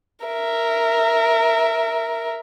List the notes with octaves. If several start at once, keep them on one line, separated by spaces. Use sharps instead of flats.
A#4 E5